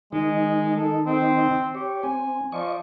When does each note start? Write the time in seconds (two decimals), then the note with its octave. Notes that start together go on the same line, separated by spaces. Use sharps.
0.12 D#3 G#3 D#4
0.76 A4
1.06 C4
1.75 G4 C#5
2.03 C4 G#5
2.52 F3 D5 D#5 C#6